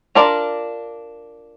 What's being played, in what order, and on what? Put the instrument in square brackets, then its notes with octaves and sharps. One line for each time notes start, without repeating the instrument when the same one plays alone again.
[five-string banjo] D4 F4 A#4 D5